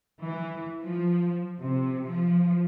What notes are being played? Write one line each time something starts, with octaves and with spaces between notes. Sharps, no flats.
E3
F3
C3
F3